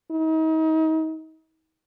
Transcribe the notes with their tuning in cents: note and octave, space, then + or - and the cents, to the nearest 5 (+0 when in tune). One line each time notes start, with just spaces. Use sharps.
D#4 +35